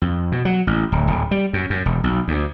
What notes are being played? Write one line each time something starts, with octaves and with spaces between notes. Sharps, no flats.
F2
B2
F#3
A1
D1
D1
G3
F#2
F#2
E1
B1
D2